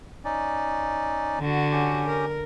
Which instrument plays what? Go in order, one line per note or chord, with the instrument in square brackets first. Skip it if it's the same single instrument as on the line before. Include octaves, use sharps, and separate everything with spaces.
[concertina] C#4 D#4 D5
[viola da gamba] D3 F#4
[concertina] C#4 G4
[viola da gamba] A#4